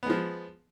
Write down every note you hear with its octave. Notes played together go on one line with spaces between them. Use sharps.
F3 G#3 B3